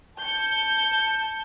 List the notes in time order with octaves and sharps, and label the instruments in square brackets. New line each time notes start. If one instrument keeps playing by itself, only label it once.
[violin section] A5 G6 C#7